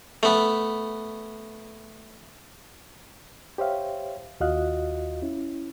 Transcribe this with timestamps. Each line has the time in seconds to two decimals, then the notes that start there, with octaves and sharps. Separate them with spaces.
0.23 A3 B3
3.58 G4 C5 C#5 E5 F5 G5
4.40 D#2 F4 F#4 D#5 F5 F#6
5.22 C#4 E4